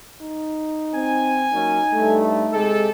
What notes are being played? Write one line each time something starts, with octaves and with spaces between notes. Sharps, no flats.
D#4
C4 G#5
F#3 A#3 C#4 D#4
G2 A3
C3 G#3 G4 A4